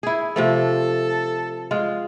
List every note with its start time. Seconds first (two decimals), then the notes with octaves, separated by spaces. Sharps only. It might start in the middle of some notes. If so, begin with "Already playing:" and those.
0.03 E4 G#4
0.36 C3 F3 A3 A4
1.71 G#3 F4